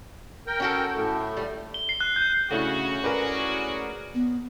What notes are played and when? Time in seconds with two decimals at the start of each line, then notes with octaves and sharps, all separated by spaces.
0.47 A#4 G5
0.60 C#4 F#4 A4
0.96 A2 A3
1.37 G3
1.74 G7
1.89 C7
2.01 F#6
2.16 G6
2.51 C#3 A3 C#4 D4 E4 F#4
3.04 G#4 A#4 B4 D5
4.15 B3